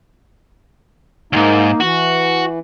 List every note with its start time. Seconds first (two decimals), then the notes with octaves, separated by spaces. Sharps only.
1.33 D2 G#2 A#3 D#4
1.80 E3 F#4